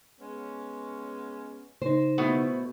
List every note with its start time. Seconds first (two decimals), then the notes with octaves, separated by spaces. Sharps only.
0.21 G#3 B3 C#4
1.82 C#3 D#4 C5
2.18 B2 A3 E4 F#5